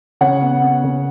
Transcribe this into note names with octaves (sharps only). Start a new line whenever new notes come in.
C#3 C#5 F#5
B3
B3
C#3